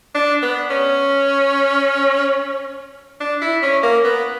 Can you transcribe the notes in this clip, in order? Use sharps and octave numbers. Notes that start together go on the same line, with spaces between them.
D4
B3
C#4
D4
E4
C#4
A#3
B3